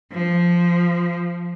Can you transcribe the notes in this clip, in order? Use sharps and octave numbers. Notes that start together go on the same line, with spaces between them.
F3